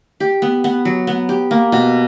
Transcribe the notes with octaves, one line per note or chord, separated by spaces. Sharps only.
G4
B3
B3
F#3
B3
G4
A#3
B2